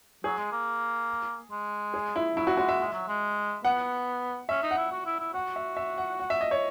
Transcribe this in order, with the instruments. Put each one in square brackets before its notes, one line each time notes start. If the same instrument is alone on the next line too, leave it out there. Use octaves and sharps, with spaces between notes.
[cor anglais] F#3 [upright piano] G#4
[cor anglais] G#3
A#3
G#3
[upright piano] G#4
E4
[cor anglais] F#3 [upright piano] E4
[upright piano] F#4
[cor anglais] G#3 [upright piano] F#4
[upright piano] E5
[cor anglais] G#3
F#3
G#3
[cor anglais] B3 [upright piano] F#5
[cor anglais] C#4 [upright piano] E5
[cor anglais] D#4
[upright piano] F#5
[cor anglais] E4
F#4
E4
E4
[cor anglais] F#4 [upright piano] F#5
[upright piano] E5
E5
F#5
F#5
E5
D#5
C#5